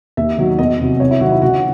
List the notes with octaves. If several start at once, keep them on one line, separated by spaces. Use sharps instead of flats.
D#2 E5
D#3 F#3
E2 D#5
C3 F#3
C2 C#5
E4
C3 D#3 F#3 F#4
E4
C#2 F#4